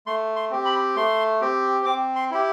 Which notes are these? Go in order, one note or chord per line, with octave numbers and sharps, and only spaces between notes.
A3 C6
C6
C4 G4
B5
A3 C6
C4 G4
C4 D6
C6
E4 G4